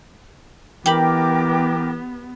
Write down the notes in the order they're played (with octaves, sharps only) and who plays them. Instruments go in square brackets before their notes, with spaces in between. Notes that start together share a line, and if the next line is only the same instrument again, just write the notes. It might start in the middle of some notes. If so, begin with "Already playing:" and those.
[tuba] E3 [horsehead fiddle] B3 [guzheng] G4 B5 [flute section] A#4 G5 D6